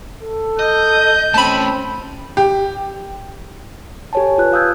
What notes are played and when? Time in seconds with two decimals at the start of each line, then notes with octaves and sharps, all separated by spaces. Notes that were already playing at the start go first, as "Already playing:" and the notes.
0.21 A4
0.59 D#5 G6
1.34 A3 C4 C#4 A5 B5
2.37 G4
4.13 G4 A4 C#5 G#5 A5
4.38 F4 B4 F#6
4.53 F5 D#6 E6 G6 G#6